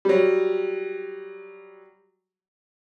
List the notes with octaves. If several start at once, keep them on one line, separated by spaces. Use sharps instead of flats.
F#3 G3